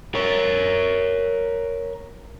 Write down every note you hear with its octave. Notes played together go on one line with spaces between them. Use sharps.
A#4 C#5